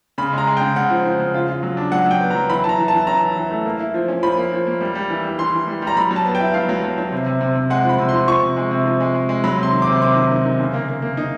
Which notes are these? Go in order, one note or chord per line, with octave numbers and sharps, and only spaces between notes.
C#3 B5
G#3 A#5
G#3
G5
C#3
C#3 F#5
F3
F3
C#3
F4
F4
F#3
D4
F#3 F#5
F#3 G5
B3
A#5
F#3
E3 B5
E3 A5 A#5
E3
A5
E3
C#4 A#5
E3
E3
A3
A#3
E4
F3
C#4
F3 B5
A#3
F3
A#3
G3
G3
E3
G3
E3 C6
E3
G3
G3
A#5
F#3 B5
F#3
A5
B3
G5
E4
F#3 F5
F#3
F#3
F#3
C3
C3
C3
C3
G#3 F#5
F3 B5
C3
C6
F3
F3 C#6
C3
G#3
C3
F3
G#3
G#3
G#3
F#3 B5
C3 C6
D#3
D6
C3
C3 D6
D#3
D#3
D#3
C#3
A#3
A#3
A#3
D#4